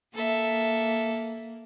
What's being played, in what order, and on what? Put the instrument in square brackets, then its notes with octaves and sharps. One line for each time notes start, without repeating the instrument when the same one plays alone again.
[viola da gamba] A#3 [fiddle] A4 E5